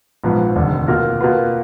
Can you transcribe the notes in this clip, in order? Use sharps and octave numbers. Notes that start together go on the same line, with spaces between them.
A#1 G#2 F3 B3
F1 D#2 D3
B2 A#3 F4 A#4
B2 A#3 F4 B4